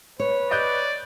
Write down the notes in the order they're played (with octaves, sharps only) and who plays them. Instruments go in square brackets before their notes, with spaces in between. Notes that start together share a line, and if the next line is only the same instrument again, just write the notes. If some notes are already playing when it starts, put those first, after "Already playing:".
[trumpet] B4 [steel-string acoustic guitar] C#5
[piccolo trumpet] D5 [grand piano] D#5 F#6 G6